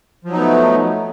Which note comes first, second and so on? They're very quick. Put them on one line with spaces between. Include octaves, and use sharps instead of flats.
F3 F#3 D#4 B3 A3